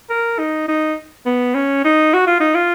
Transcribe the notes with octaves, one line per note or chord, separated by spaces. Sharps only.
A#4
D#4
D#4
B3
C#4
D#4
F#4
F4
D#4
F4